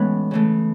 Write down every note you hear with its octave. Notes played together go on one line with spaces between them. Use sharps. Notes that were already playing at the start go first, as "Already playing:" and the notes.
Already playing: A2 E3 G#3 B3 C#4 B4 C#5
C#3 E3 A3